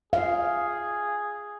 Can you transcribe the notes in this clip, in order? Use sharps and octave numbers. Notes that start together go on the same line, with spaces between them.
G#4 F5